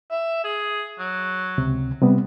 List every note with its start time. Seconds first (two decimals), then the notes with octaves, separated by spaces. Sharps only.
0.10 E5
0.44 G#4
0.99 F#3
1.58 C#2 C3
2.01 C3 G3 B3